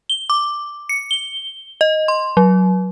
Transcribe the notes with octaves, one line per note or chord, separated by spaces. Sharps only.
G7
D6
C#7
G7
D#5
C6
F#3